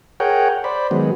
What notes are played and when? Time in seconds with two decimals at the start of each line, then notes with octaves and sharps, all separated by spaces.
0.20 G#4 A#4 C#5 F#5 G5
0.64 C5 D5 B5
0.91 D#3 F#3 G#3 B3